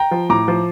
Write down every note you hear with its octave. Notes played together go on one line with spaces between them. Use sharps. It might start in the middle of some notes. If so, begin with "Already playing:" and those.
Already playing: G5 A#5
F3
A2 A#5 D6
F3